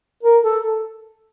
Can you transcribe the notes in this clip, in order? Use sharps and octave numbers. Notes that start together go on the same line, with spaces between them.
A#4
A4